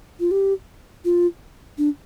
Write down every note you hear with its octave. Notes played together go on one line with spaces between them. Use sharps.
F4
G4
F4
D4